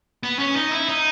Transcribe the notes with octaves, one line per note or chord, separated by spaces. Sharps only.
B3
C#4
D#4
E4
D#4